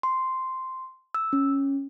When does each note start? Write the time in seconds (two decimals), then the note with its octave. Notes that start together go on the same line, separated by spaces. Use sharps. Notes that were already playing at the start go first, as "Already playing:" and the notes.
0.03 C6
1.14 E6
1.33 C#4